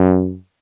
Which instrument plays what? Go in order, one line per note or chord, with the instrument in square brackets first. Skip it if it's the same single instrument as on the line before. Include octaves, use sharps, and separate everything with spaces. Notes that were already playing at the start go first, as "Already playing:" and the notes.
Already playing: [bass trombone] F#2